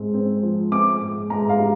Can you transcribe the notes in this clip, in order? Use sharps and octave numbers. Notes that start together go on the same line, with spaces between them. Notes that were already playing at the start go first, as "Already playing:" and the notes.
Already playing: G#2 C4
C4
F3
C4 D6
G#2
G#2 A#5
F5
G3